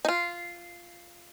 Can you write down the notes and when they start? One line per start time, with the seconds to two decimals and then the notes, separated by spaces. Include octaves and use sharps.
0.05 D#4
0.08 F4